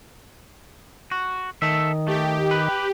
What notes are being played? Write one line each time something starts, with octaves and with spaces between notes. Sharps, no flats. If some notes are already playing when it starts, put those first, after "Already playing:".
F#4
D#3 A4 E5
A3 G4
B4